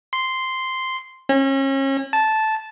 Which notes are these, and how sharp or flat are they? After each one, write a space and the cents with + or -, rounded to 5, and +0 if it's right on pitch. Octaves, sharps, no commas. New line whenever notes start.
C6 -5
C#4 -35
A5 -10